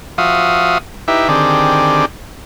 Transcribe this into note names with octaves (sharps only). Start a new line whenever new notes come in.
F3 F#4 E5 F5 D#6
D#4 E4 G4 B4 E5
D3 D#3 C4 G4 G#4 D5